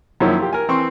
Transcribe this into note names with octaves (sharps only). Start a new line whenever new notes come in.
F#2 D#3 F3 A#3 C#4 E4
F4 G4
A#4 G#5
E3 C4 C5 C#6